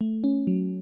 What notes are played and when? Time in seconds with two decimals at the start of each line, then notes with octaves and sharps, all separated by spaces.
0.01 A3
0.24 C#4
0.47 F#3